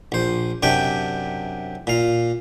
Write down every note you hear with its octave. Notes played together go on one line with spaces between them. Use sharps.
A#1 C5
F#2 C3 D4 G5
A#2 F5